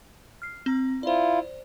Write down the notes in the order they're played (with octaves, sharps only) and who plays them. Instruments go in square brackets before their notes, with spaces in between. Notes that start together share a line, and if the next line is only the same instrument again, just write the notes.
[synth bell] F6 C7
C4 A#5
[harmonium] E4 F4 [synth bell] C5 D5